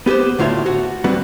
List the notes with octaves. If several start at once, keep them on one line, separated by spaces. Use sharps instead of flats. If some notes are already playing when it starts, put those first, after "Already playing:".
B3 G4 G#4 B4 C5
D2 A2 F4 C#5 E5
F#4
G3 B3 C4 F#4 B4